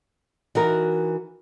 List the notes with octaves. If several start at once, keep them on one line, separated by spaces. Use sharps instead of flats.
E3 D#4 F#4 A#4